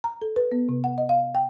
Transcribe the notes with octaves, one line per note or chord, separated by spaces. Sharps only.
A#5
A4
B4
B3
C3
F#5
D#5
F5
G5